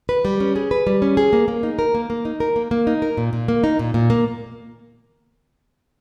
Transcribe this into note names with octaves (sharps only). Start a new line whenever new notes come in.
B4
G3
C#4
G#4
B4
G3
C#4
G#4
A#3
A#3
D#4
A#4
A#3
A#3
D#4
A#4
A#3
A#3
D#4
A#4
A#2
A#2
A#3
D#4
A#2
A#2
A#3